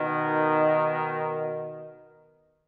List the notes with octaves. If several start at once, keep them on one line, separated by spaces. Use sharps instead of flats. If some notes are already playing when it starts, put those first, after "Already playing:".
Already playing: B2 D#3